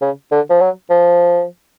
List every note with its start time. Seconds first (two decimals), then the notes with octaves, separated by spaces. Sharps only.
0.01 C#3
0.32 D3
0.50 F3
0.61 F#3
0.90 F3